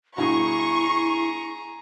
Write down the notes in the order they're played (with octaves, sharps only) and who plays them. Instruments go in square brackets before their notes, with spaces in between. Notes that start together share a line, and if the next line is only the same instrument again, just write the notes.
[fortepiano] G2 B2 F#4 [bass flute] E4 [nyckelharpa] G#4 A#5 [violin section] C#6